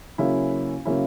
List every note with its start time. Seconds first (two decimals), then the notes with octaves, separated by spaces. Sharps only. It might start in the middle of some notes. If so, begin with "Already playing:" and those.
0.18 C#3 F#3 A#3 C#4 E4
0.85 C#3 F#3 A#3 C#4 E4